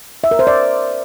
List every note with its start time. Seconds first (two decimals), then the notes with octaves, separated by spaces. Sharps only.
0.24 E5
0.31 A#4
0.39 C5
0.47 D5